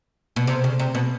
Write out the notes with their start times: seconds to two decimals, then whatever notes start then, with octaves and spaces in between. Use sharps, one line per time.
0.36 B2
0.47 C3
0.64 C#3
0.79 C3
0.95 B2